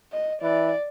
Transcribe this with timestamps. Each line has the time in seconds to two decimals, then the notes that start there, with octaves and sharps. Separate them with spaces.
0.12 D#5
0.42 E3 D5